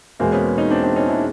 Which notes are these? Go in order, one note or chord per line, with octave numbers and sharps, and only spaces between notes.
E2 B2 G#3 A#3 C4
B3 C#4
C#4 D#4
C4 D4
C4 D4
C#4 D#4
D4 E4